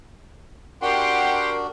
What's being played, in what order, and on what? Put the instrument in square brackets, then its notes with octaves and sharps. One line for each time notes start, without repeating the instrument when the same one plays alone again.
[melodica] D4 F#4 [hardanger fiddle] G4 [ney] A#4 [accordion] F#5 G5 C6